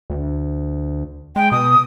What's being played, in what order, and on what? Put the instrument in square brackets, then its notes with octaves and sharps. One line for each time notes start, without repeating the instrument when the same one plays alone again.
[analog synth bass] D2
[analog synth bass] G#3 [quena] G5
[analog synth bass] B2 [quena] D#6